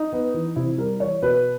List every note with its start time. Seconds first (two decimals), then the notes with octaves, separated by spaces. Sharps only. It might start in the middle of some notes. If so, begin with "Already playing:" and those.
Already playing: D#4
0.12 B3
0.34 E3
0.56 C3 E4
0.78 G3 A#4
1.00 E3 C#5
1.22 B2 B4